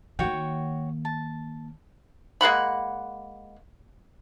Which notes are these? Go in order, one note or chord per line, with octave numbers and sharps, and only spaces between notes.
D#3 A#3 F#4 C#5 G5
A5
G#3 A#3 F#5 B5